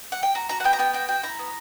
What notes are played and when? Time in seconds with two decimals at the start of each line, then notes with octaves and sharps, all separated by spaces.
0.12 F#5
0.23 G5
0.35 F#4 A#5
0.49 F#4 A#5
0.60 F#5
0.64 B3 G5
0.73 A#5
0.79 B3 G5
0.93 F#4 G5
1.08 F#4 G5
1.23 E4 A#5
1.39 B3